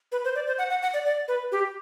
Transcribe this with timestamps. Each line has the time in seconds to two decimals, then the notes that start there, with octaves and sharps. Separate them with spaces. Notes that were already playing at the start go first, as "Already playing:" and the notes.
0.12 B4
0.24 C5
0.35 D5
0.47 C5
0.58 F#5
0.70 F#5
0.82 F#5
0.94 D5
1.05 D5
1.28 B4
1.52 G4